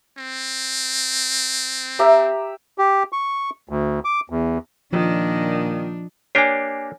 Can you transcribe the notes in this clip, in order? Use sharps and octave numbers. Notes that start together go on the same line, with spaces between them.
C4
G4 E5 A#5
G4
C#6
D2
D6
E2
A#2 D#3 F3 D4
A#3 D4 G4 C#5 G#5 C7